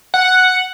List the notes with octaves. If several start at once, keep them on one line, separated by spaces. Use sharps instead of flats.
F#5